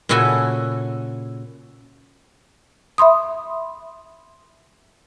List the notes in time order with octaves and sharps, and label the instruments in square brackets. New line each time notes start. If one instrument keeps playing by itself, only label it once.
[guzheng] A#2 C#3 E4 F#4 A4 G#5
[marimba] E5 B5 C6 D#6